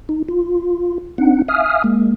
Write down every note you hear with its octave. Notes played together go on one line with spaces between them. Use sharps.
D#4
F4
C4 D4 D#4 F#5
E5 F5 G#5 D#6 F6
G#3 A#3